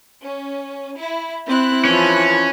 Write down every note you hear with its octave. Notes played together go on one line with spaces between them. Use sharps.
C#4
E4
C4 E4 F#6
E3 F3 C#4